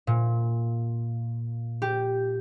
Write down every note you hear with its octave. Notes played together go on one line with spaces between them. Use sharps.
A#2
G4